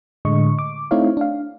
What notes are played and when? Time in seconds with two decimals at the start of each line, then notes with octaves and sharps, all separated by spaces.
0.25 A2 D3 G#3 D#5 C#6
0.59 D6
0.91 A3 C4 D#4 E4 C#5 F5
1.17 D4 F5